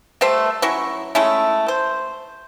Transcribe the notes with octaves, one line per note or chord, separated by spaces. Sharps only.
G3 A3 C5 E5
F#3 C#4 E4 C#6
G#3 A3 C#4 E4
C5